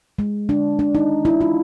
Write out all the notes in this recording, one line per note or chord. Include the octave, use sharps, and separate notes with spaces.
G#3
D4
D4
D#4
E4
F4